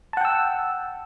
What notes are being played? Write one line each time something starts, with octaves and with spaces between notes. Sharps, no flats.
F#5 G5 A5 E6